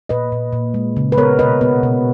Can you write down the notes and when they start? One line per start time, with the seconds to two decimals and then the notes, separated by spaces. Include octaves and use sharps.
0.09 A#2 B4 D#5
0.32 A#2
0.53 A#2
0.74 G#3
0.97 C#3
1.12 B4
1.18 B3 A#4 C#5
1.39 B2 B4 D#5
1.61 B3
1.83 B2